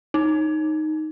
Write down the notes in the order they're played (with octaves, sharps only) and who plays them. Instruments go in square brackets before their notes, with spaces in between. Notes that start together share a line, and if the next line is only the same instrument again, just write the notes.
[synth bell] D#4